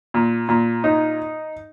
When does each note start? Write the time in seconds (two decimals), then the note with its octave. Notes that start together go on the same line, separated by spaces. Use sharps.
0.14 A#2
0.49 A#2
0.84 D#4